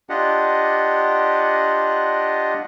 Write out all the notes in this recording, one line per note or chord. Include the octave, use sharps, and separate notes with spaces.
D4 F4 G4 D#5 F#5